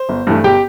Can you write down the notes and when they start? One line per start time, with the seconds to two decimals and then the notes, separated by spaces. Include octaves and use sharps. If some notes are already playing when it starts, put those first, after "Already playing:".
Already playing: C5
0.09 G1
0.27 G2 E3 A3
0.44 G1 G4 G5